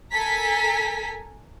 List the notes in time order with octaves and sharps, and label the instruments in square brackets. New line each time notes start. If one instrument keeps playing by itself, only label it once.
[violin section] A4 A#4 G#5 A#5 B6